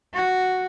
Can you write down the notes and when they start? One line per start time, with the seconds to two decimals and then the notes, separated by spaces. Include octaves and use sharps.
0.14 F#4